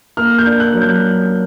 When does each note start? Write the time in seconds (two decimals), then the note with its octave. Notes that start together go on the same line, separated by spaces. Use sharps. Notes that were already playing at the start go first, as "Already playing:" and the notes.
0.17 A#3 F6
0.38 G6
0.46 D4
0.60 F#6
0.74 F#3
0.81 G6